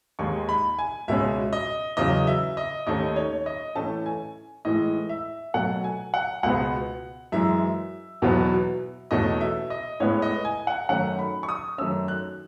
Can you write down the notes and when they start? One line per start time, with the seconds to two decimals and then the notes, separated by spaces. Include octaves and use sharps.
0.19 D#2 D#3 G#3 C#6
0.49 B5
0.79 G#5
1.08 C#2 B2 G#3 C#4 E5
1.53 D#5
1.97 E2 C#3 F#3 D#5
2.27 E5
2.57 D#5
2.87 D#2 D#3 A3 C#4 D#5
3.16 C#5
3.46 D#5
3.75 A2 E3 A3 C#4 A5
4.06 G#5
4.65 A2 E3 G#3 D#5
5.09 E5
5.54 B2 F#3 A3 F#5
5.84 G#5
6.14 F#5
6.43 C#2 B2 G#3 B3 F#5
7.32 F#2 E3 G#3 E5
8.22 E2 B2 F#3 B3
9.11 E2 B2 A3 C#4 D#5
9.41 E5
9.70 D#5
10.00 A2 G#3 B3 C#5
10.22 D#5
10.45 G#5
10.67 F#5
10.89 F#2 D#3 A3 C#4 F#5
11.19 B5
11.43 C#6
11.49 D#6
11.78 F#2 D#3 A3 C#4 E6
12.08 F#6